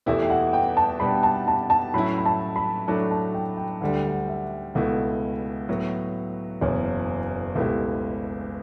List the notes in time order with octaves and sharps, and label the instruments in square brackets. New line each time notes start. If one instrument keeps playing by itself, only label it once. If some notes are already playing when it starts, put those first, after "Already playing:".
[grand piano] E2 B2 A3 E4 G4 [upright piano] E5
[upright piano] G5
F#5
G5
A5
[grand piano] B2 G3 D4 [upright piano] B5
[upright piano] A5
A5
A5
[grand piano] A2 F#3 C#4 E4 [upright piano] B5
[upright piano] B5
A5
B5
[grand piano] A2 F#3 A3 D4 [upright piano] A5
[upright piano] A5
G5
G5
[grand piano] D2 D3 G3 [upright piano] F#5
[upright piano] G5
F#5
E5
[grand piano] C#2 B2 A3 E4 [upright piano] F#5
[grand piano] A2 F#3 B3
[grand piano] F#1 E2 B2 [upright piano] C#5
[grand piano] C#2 B2 A3 E4 G4